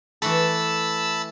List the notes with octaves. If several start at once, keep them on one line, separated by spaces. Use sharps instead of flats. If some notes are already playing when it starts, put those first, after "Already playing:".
E3 A3 A4 A5 B5 E6